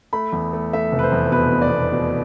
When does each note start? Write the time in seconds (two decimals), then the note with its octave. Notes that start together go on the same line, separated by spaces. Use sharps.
0.13 A3 B5
0.33 E2
0.53 A3
0.73 A3 E5
0.92 F1
0.99 B4
1.03 C5
1.12 E2
1.32 B2 B4
1.52 B2
1.62 D5
1.71 B2
1.92 B2